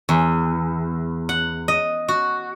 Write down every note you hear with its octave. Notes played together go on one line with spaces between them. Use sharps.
E2
F#5
D#5
F#4